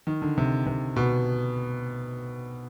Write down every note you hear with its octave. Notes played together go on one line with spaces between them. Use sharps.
D#3
D3
C3
C3
B2